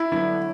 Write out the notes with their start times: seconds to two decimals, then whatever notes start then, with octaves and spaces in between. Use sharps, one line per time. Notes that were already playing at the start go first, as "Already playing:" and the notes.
Already playing: E4
0.12 D3 F#3 B3 E4